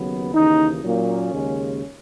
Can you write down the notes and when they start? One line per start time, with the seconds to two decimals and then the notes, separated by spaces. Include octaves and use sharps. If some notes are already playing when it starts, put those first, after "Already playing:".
Already playing: D#2 C#3 F#3 B3
0.33 D#2 C#3 E3 D#4
0.82 A#2 F#3 A#3 C#4
1.32 D#2 C#3 G#3